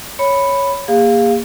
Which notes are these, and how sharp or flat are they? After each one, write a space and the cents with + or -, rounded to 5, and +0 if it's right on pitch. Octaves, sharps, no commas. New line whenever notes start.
C#5 +0 B5 +5
A#3 +0 G#4 -35 F5 +0